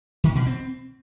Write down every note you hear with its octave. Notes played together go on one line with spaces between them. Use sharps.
D#3
B2
C4